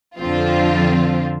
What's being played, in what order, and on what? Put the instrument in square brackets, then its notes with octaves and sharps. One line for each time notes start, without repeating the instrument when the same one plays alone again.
[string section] F2 D3 F3 C4 F4